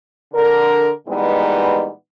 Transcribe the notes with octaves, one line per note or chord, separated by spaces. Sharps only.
D3 A#4
A#2 E3 G3 G#3 B3 D#4